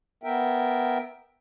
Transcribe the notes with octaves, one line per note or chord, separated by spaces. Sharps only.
B3 A#4 E5 G5